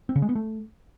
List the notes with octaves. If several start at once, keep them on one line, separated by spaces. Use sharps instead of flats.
C4
C#3
G#3
B3
A3